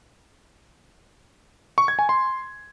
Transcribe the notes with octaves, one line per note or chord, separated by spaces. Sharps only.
C#6
G#6
G#5
C6